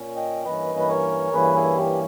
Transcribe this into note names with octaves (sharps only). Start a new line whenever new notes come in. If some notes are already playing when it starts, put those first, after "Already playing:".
Already playing: A#2 A#3 C#4
D#5 G5
G2 E3 A#3 C#4 B4 D#5
B4
A#4 C#5
G2 E3 A#3 C#4 G#4 B4
E4 G#4
G4